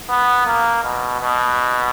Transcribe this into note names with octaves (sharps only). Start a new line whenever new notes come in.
B3
A#3
B2
B2